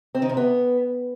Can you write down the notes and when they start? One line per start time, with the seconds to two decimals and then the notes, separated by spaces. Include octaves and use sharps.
0.15 C4
0.22 D#3
0.29 C3
0.37 B3